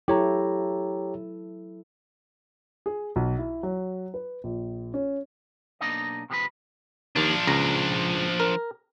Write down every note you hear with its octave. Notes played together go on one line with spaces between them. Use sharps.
F#3 E4 G4 A4 C#5 A#5
G#4
B1
E4
F#3
B4
A#1
C#4
B1 F2 A#3 D4 D#4 D#5
C3 F3 G#3 G4 B4
D#2 F3 D4
C#2 A#5
A#4